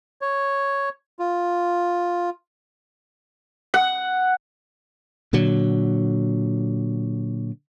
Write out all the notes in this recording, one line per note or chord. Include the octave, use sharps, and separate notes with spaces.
C#5
F4
F#5
A#2 D3 F#3